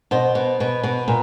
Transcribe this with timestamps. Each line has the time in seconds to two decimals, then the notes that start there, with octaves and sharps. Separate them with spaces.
0.11 B2 C5
0.35 B2
0.60 B2
0.83 B2
1.08 A#2